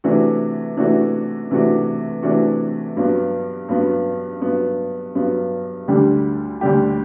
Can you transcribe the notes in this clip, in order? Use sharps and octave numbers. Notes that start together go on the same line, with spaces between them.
C3 E3 A3 D4 F#4
C3 E3 A3 D4 F#4
C3 E3 A3 D4 F#4
C3 E3 A3 D4 F#4
G2 F#3 B3
G2 F#3 B3
G2 F#3 B3
G2 F#3 B3
D2 D3 G3 D4 G4
D2 D3 G3 D4 G4